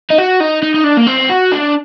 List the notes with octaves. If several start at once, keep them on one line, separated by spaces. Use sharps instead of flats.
D#4
F#4
D#4
D#4
D#4
D4
A#3
C4
F#4
D4